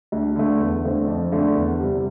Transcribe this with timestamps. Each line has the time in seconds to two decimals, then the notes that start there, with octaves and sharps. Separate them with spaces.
0.12 D2
0.36 D3 A3
0.60 E2
0.84 D3 A3 C4
1.07 F2
1.32 D3 A3 D4 A4
1.56 E2
1.80 C3 G3